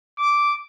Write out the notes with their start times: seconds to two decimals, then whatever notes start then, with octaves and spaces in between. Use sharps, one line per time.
0.18 D6